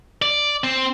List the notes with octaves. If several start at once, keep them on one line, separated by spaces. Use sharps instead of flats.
D5
C4